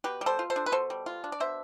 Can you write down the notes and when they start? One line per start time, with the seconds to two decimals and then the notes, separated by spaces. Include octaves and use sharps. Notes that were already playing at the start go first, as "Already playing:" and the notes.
0.04 B2 G4 B4
0.21 G3
0.26 A4 C5
0.39 F4
0.50 A4 C5
0.56 D4
0.66 B4
0.72 B2 A4 C5
0.90 G3
1.06 F4
1.24 D4
1.32 D5
1.40 B2 C5 E5